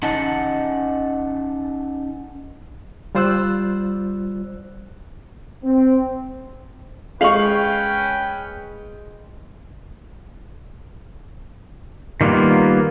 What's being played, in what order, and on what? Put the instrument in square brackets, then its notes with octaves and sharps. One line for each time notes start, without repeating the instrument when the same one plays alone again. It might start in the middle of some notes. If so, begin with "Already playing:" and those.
[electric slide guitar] C#4 D#4 D#5 F#5 A5
[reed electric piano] G3 F4 C5 D5 E6 F#6
[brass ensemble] C4
[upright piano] G#3 F#7 [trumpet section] C#4 B4 G5 [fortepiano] F5 C#6
[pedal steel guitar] D#3 G3 A#3 B3 F4